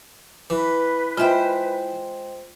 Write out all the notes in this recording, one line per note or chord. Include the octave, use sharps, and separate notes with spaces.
E3 B4
G#3 F4 C5 E5 G5